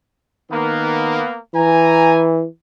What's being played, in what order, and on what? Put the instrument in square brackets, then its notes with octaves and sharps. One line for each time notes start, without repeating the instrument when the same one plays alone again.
[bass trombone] D#3 [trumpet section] A#3 B3
[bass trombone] E3 [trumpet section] G#5 A#5